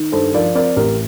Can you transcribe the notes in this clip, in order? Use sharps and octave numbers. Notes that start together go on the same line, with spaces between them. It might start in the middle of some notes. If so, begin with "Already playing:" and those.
Already playing: D#3
G2 A4 C5
F3 A#4 D5
C4 A#4 D5
A1 G4 A#4